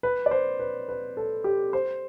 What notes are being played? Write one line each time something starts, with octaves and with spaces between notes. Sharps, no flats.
B4
D5
C5
B4
B4
A4
G4
C5